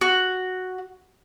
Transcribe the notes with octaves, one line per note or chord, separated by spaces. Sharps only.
F#4